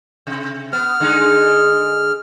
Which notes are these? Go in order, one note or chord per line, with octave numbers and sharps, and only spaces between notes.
C3
B3 F6
D3 G#3 D#4